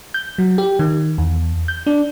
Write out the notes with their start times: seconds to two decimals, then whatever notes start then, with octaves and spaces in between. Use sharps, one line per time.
0.14 G6
0.38 F#3
0.58 G4
0.79 D#3
1.18 E2
1.68 G6
1.87 D4